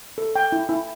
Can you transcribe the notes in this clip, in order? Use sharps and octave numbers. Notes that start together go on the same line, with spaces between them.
A4
G5
E4
E4